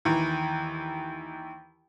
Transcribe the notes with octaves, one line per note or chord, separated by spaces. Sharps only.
D#2 E3